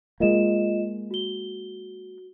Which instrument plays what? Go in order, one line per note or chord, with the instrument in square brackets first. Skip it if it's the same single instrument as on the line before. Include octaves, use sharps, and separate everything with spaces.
[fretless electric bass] G#3 A#3 [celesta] F4 D#5 E7
[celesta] F#4 G7